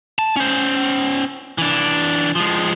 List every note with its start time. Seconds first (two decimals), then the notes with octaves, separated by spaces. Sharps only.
0.19 A5
0.36 C#4 C5
1.58 E3 D4
2.36 F3 G#3